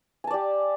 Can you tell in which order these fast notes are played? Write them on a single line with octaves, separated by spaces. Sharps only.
G#5 A5 D5 G4